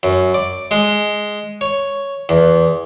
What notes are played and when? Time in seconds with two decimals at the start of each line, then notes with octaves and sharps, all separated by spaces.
0.03 F#2
0.34 D5
0.71 G#3
1.61 C#5
2.29 E2